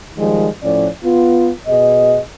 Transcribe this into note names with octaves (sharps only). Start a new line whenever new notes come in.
D#3 F3 G3 G#3
A2 F3 C#4 D5
B3 F4
B2 G#4 D#5